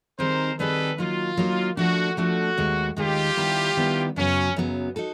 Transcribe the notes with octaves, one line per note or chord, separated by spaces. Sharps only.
D#3 G3 C4 D#4 G#4 A#4 C5
D#3 G3 C4 D#4 G#4 A4 B4
F#3 A#3 D#4 F4 F#4
F#3 A#3 D#4 F#4
F3 A3 D4 F#4
F3 A3 D4 F#4
D#2 D#3 G#3
D#2 D#3 G#3 F4 G4
D#3 G3 B3 E4
D#3 G3 B3 E4
F#2 C#3 F#3 B3 C#4
F#2 C#3 F#3 B3
D#4 F#4 A4